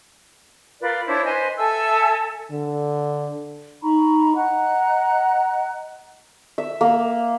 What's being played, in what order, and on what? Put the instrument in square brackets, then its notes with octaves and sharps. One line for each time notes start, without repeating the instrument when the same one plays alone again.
[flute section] F4 A#4 B4 D5
D4 E4 C5 C#5
B4 C5 D#5 G#5
A4 E5 G#5 E6
[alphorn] D3
[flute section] D#4 A#5 B5 C#6
D#5 F#5 A#5 F#6
[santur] E5
A#3